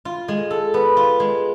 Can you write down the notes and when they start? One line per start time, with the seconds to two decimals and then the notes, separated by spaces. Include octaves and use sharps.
0.05 F4
0.28 G#3
0.51 A4
0.74 B3
0.97 F4
1.20 G#3